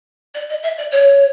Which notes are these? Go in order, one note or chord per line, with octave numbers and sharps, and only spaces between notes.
D5
D#5
E5
D5
C#5